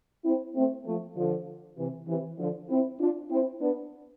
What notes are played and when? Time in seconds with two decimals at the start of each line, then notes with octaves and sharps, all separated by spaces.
0.25 C4 E4
0.56 A3 C4
0.86 F3 A3
1.17 D3 F3
1.78 C3 E3
2.08 C3 E3
2.39 D3 F3
2.69 C4 E4
3.00 D4 F4
3.31 C4 E4
3.61 B3 D4